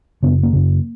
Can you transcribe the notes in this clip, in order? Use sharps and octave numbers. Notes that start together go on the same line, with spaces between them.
F#2 C#3 B3
A#3
F#2 C#3